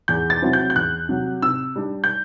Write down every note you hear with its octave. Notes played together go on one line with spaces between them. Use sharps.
E2 G6
A6
C3 F#3 C4 E4
G6
G6
E2 F#6
C3 F#3
C3 E6
G3 D4
G6